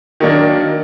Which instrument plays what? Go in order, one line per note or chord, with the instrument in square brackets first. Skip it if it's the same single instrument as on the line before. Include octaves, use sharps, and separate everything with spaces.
[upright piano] D#3 F#3 A#3 D4